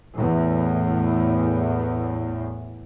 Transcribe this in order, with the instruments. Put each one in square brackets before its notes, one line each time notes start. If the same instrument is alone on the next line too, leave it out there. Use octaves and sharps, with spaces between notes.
[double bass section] E2 A2